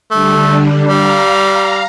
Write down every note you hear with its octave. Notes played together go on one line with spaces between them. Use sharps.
D3 G3 A3 D4
G3 F5 A#5